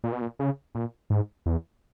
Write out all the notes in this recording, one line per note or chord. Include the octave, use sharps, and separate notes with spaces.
A#2
B2
A#2
C#3
A#2
G#2
E2